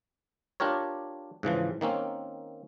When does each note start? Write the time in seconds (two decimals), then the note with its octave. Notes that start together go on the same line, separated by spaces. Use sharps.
0.60 D4 F4 G4 A#4 C#5
1.43 G#2 C#3 E3 F3
1.81 D#3 A#3 C4 C#4